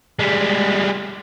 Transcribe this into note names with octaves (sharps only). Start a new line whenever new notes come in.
G3 G#3